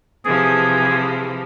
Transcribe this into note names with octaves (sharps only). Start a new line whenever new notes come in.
C3 E3 F3 G#4